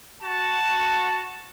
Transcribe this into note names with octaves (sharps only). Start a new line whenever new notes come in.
F#4 A5